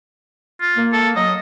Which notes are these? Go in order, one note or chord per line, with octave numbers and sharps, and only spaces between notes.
F4
A#3
A4
F#3 D#5